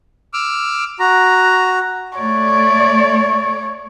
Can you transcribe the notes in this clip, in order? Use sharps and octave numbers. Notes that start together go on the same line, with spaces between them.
D6 E6 F6
F#4 A#5
A3 C#5 D5